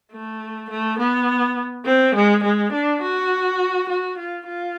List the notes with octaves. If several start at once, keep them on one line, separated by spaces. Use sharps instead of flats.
A3
A3
B3
C4
G#3
G#3
D4
F#4
F#4
F4
F4